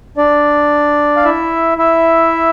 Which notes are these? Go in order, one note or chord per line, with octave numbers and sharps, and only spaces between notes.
D4 D5
F5
E4 E5
E4 E5